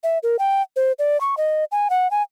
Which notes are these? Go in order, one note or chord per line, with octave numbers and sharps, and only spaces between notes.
E5
A#4
G5
C5
D5
C#6
D#5
G#5
F#5
G#5